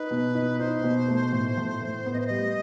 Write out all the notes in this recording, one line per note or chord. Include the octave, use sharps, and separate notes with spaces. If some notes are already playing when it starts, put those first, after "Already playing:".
Already playing: D#4 B4
B2
D#4
D#4 C5
B2
A3
A2
A2
A2
B3
D#5
C5
G3 D#5